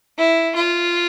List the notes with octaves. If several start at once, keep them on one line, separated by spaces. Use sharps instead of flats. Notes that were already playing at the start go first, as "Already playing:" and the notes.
E4
F4